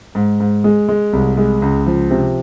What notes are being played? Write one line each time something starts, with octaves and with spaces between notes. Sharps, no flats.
G#2
G#2
G#3
G#3
C2
G#3
C#2
F3
C3